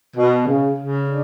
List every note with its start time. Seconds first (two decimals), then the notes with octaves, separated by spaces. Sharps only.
0.15 B2
0.46 C#3
0.77 C#3
1.07 D4